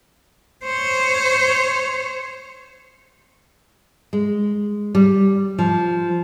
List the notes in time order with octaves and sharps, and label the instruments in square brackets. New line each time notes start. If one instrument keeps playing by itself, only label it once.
[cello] C5 C#5
[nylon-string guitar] G#3
G3
F3